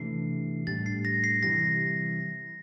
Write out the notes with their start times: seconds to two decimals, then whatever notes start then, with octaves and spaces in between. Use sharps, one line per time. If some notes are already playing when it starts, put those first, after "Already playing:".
Already playing: C3 E3 A3 D4 C7
0.67 A2 G3 D4 A6
0.86 C7
1.05 A#6
1.24 C7
1.43 C3 E3 G3 A#6